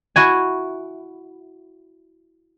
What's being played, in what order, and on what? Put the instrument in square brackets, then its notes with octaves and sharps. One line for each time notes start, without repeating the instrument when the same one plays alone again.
[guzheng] E4 F#4 G#5